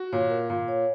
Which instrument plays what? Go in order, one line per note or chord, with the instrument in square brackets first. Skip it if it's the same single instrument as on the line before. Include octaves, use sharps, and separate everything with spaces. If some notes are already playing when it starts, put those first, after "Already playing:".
Already playing: [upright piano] F#4
[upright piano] A#2 [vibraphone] C#5
[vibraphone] A#4
[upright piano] A#2 [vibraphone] A#4
[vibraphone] C#5